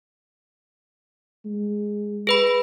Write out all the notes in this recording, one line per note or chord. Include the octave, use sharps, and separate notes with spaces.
G#3
G#4 B4 B5